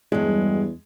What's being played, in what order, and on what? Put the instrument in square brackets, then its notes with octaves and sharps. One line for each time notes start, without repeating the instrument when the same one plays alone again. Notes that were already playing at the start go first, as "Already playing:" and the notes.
[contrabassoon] E2 [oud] G2 F#3 [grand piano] G#3